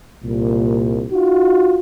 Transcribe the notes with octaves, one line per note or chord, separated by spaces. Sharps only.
C2 A#2
D#4 F4 F#4